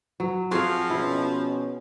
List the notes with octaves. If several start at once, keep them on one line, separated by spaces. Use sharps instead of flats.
F#3
F3 C4 F#4 G#4 F5 C6
B2 C#4 E4